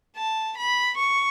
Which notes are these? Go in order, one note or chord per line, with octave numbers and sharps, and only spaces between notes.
A5
B5
C#6